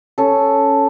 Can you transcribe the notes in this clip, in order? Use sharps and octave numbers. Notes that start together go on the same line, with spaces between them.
C#4 A4